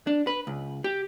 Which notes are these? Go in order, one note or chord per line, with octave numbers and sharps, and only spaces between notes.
D4
B4
C#2
G4